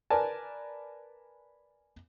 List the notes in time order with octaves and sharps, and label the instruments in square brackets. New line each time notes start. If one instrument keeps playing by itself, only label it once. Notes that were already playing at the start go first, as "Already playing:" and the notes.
[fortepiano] A#4 B4 D5 G#5 A5